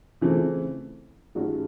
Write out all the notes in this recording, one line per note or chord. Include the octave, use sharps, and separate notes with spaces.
C#3 E3 A3 C4
G2 D#3 G#3 C#4 F#4